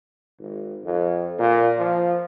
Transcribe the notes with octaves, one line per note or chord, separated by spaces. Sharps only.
G#1
F2
A#2
F3